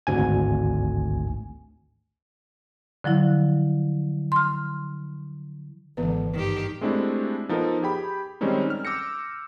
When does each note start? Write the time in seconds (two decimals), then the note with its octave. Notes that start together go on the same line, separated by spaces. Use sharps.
0.07 G#1 D2 G#5
3.04 D3 F3 F#3 E4
4.32 C6 F6
5.97 G#1 D3 E3 B3 B4
6.33 G2 D#3 G4
6.81 G#3 A3 C4 D4 E4 G4
7.49 F3 B3 D#4 A4 A#4
7.82 G4 G#4 G5 B5
8.41 D#3 G3 G#3 C4 C#4 D#4
8.70 F6
8.85 D6 E6 G6 A#6 C#7